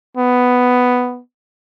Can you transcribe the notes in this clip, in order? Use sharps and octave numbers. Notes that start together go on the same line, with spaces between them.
B3